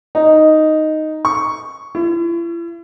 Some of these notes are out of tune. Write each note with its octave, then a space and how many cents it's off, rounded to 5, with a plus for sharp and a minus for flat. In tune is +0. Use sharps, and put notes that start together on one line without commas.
D#4 +0
C#6 +5
E4 +45